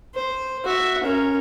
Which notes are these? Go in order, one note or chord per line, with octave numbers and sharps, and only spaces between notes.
C5
F#4 E5
C#4 A#4